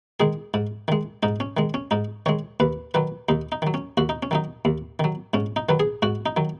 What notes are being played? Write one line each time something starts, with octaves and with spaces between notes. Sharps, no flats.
D#3 G#3 G#4
G#2
D#3 G#3
G#2 D#4
C#4
D#3 G#3
C#4
G#2 D#4
D#3 G#3 C#5
D#2 B4
D#3 F#3 B4
D#2 D#4
D#4
D#3 F#3
C#4
D#2 F#4
D#4
C#4
D#3 F#3 D#4
D#2
D#3 F#3
G#2 C#4
D#4
D#3 F#3 B4
G#4
G#2 F#4
D#4
D#3 F#3